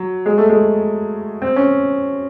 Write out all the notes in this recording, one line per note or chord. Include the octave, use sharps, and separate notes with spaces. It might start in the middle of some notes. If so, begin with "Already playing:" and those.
Already playing: F#3
G#3
A3
G#3
C4
C#4